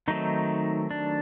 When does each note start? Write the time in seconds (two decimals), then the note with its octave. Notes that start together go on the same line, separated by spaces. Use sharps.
0.08 D#3 F#3 A3 C4 D#4
0.91 D4